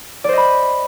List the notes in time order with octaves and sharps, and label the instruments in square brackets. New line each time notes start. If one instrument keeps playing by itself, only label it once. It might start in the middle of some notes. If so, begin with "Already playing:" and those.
[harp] D5
C5
D#5
B5